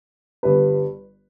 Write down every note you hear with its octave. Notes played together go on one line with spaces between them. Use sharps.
G1 G2 G3 B4